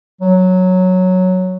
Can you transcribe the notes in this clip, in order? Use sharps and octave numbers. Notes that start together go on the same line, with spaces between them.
F#3